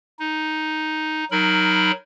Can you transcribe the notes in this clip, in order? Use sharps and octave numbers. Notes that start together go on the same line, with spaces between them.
D#4
F#3 D#4 A#4 B5